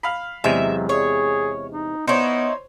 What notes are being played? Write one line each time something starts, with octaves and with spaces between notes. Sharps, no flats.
F5 B5
E2 C3 F#3 G#3 E5
G#4 C#5
D#4
B3 D#4 E4 C5 C#5